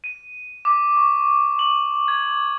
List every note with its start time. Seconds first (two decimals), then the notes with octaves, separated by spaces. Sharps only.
0.04 D#7
0.65 D6
0.97 C#6
1.59 F#7
2.08 G#6